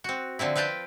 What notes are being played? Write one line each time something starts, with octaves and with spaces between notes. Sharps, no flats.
C4 F#4
D3 F3 C4 E4
C4 B4 F5 G5 A5